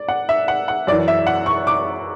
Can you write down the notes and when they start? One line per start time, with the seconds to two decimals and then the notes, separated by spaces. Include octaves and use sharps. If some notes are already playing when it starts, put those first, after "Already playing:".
Already playing: D5
0.08 F#5
0.29 E5
0.48 F#5
0.68 F#5
0.87 F#2 D5
0.92 E3
1.08 E5
1.27 F#5
1.46 C#6
1.67 D6